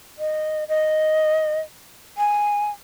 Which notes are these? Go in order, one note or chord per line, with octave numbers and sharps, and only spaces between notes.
D#5
D#5
G#5